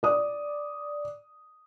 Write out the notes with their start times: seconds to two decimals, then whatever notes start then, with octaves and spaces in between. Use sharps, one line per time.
0.03 D5 D#6